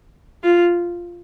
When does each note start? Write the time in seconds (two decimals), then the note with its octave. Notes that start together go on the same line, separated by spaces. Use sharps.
0.43 F4